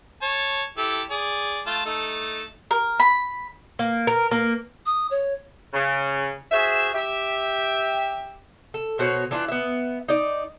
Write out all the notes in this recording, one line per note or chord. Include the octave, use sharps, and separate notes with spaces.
C#5 A5
E4 G4 A4
G#4 D5
A3 F4 A5
A3 D#4 A4
A#4
B5
A#3
A#4
A#3
D#6
C#5
C#3
F#4 G#4 C5 E5
G4 E5
A4
B2 F#4 C5 C#5
E3 D4 F4
B3 E5
D#4 D5